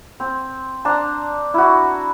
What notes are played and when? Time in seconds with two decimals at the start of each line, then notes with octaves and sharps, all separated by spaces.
0.20 C4
0.85 D4 C5 A5 A#5
1.54 E4 F#4